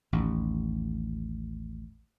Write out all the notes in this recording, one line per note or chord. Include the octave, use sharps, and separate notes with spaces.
A1 D#2